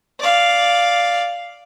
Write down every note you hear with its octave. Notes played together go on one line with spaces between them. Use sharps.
D5 F5